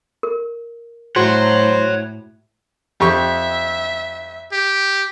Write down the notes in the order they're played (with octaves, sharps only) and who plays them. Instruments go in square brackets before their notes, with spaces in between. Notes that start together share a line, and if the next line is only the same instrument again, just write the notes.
[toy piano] A#4
[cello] A2 [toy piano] F#4 [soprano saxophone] C5 [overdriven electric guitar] C#5 F#5
[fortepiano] F2 G4 C#6 [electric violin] E5
[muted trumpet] G4